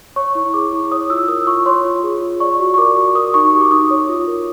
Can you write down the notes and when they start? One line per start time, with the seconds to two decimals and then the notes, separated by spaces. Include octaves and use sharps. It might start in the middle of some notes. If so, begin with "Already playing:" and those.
0.16 C#5 C#6
0.35 E4
0.54 G#4 D6
0.73 E4
0.92 C#5 D#6
1.10 F4 E6
1.28 A#4 D#6
1.47 F4 C#6
1.66 C#5 C6
1.85 F4
2.03 G#4
2.22 F4
2.40 D5 C#6
2.59 F#4
2.74 C#6
2.78 A#4 D6
2.97 F#4
3.15 A#4 D#6
3.34 D#4 C#6
3.53 G4
3.61 D6
3.71 D#4 D#6
3.90 C#5
4.09 F4
4.27 A#4